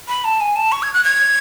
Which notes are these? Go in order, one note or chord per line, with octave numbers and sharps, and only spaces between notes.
B5
A5
G#5
A5
C#6
G#6
F#6
G#6